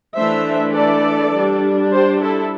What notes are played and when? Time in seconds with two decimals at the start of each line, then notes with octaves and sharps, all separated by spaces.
0.16 E3 A3 D4 C5 E5
0.75 A4 D5
1.33 G3 D4
1.92 G4 C5
2.20 E4 A4